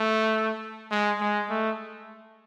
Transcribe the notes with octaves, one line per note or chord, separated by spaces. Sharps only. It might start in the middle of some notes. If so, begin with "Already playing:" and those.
Already playing: A3
G#3
G#3
A3